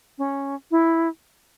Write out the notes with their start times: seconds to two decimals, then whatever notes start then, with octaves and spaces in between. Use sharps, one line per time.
0.18 C#4
0.71 E4